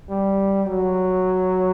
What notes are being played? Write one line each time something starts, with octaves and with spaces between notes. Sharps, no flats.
G3
F#3